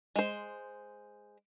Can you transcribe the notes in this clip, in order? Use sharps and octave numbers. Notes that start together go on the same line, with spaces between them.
G#3 C5